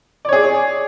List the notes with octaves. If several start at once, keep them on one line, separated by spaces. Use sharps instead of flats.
G#4 C#5 D5